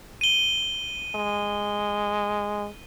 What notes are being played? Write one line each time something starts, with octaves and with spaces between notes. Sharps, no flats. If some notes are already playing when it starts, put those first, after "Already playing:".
D#7 G7
G#3